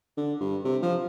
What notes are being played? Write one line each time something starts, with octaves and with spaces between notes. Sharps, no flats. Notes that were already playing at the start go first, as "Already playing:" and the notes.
D3
G2
C3
F3